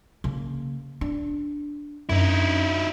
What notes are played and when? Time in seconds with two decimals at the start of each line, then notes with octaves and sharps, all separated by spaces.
0.24 C#3 A#3
1.01 D4
2.09 F#2 D#4 E4